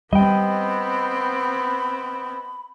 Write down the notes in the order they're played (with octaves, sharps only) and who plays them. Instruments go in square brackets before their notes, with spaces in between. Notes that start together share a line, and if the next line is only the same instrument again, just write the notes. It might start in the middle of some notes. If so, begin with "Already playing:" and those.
[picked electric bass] G3 [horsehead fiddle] B3 C4 [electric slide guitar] D#5 G5 [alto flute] B5